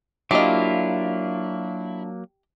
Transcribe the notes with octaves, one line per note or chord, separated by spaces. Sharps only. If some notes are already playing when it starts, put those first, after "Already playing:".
F#3 A#3 D4 E4 F4 G4 D#5